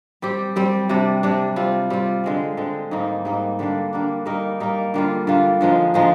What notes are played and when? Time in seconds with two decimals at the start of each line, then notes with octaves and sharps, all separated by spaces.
0.22 G3 C4 G4
0.56 G3 C4 G4
0.89 C3 G3 D4
1.23 C3 G3 D4
1.56 G3 C4 F4
1.90 G3 C4 F4
2.24 D3 G#3 C4
2.57 D3 G#3 C4
2.91 G#2 G3 A#3 D#4
3.25 G#2 G3 A#3 D#4
3.59 D3 G3 A#3 D4
3.93 D3 G3 A#3 D4
4.26 G3 A#3 D#4 A#4
4.60 G3 A#3 D#4 A#4
4.94 D3 G3 A#3 F4
5.27 D3 G3 A#3 F4
5.61 D3 F3 G#3 D#4
5.94 D3 F3 G#3 D#4